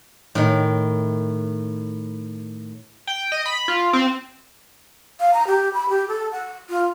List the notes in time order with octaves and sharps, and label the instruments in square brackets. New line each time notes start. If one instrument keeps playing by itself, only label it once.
[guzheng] A2 D#3
[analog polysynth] G5
D#5
B5
F4
C4
[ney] F5
A#5
G4
B5
G4
A4
F#5
F4